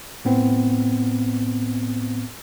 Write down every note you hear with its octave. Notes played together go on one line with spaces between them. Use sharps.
A2 B3 C4